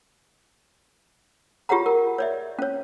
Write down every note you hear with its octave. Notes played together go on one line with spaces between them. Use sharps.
F4 G4 G#4 C#5 F#5 A#5
A#4
C#5 D5 E5
C#4 C#5